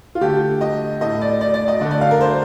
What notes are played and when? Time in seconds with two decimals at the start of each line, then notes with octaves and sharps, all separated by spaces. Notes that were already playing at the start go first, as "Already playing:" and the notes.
0.15 F4
0.21 D3 A3 G4
0.61 D#5
1.01 A2 A3 D#5
1.21 D5
1.41 D5
1.54 D5
1.68 D#5
1.81 D3 A3
1.91 D5
2.01 F5
2.11 A#4
2.21 C5